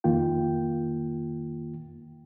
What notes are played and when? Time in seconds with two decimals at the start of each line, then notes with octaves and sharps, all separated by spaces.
0.04 F2 D#3 A#3 F4 G5